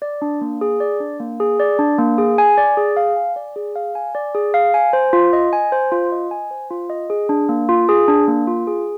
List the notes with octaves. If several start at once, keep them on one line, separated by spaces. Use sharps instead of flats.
D5
D4
A#3
G#4
D5
D4
A#3
G#4
D5
D4
A#3
G#4
G#5
D5
G#4
F5
G#5
D5
G#4
F5
G#5
D5
G#4
F5
G#5
C5
F4
D#5
G#5
C5
F4
D#5
G#5
C5
F4
D#5
G#4
D4
A#3
F4
G#4
D4
A#3
F4
G#4